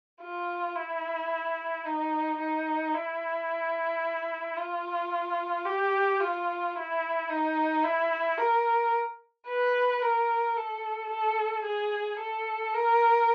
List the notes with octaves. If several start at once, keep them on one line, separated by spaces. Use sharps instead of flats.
F4
E4
D#4
D#4
E4
F4
G4
F4
E4
D#4
E4
A#4
B4
A#4
A4
A4
G#4
A4
A#4